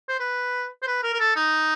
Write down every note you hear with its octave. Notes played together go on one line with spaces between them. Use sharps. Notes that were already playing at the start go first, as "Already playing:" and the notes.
C5
B4
C5
B4
A#4
A#4
A4
D#4